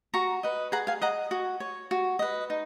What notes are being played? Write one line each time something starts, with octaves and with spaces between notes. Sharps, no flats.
F#4 A#5 C#6
B4 D#5
G#4 F#5 A#5
F5 G#5
D#5 F#5 A#5
F#4
C#5
F#4
B4 D#5
D#4